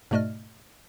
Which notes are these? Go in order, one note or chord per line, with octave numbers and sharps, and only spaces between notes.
G#2 B2 A3 D5 D#5 F6